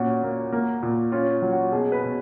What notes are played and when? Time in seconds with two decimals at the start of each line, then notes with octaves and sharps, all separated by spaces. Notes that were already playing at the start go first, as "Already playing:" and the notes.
Already playing: A#2 C#4 F#4
0.23 A#3
0.52 A#3
0.82 A#2
1.12 C#4 F4
1.42 F#3
1.52 F#4
1.72 B2 G#4
1.92 B4
2.03 B2